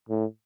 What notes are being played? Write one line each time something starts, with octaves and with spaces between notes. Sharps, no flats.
A2